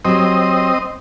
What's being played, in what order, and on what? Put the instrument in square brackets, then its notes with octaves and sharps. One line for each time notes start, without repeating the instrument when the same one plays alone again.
[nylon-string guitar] F#3 G4 [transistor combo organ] C4 D#5